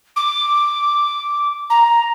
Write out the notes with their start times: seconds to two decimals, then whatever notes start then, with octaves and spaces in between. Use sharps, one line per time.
0.16 D6
1.70 A#5